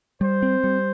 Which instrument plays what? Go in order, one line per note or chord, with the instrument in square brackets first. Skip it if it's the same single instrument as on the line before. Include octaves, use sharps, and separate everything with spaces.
[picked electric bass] G3 [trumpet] C5
[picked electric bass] C4
G3